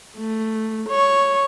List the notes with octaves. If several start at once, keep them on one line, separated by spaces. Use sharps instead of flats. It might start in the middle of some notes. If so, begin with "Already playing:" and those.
A3
C#5 C#6